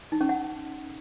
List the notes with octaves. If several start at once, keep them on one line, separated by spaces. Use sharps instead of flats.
D#4
C#4
F#5